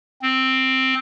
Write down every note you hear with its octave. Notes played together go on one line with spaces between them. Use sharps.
C4